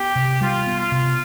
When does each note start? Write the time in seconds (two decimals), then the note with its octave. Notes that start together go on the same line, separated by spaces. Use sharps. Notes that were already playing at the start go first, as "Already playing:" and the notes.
Already playing: B3 G4
0.16 C3
0.41 G3 F4
0.67 B3
0.79 F4
0.92 C3